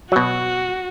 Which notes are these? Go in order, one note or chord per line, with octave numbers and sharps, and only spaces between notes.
B2 F#3 F#4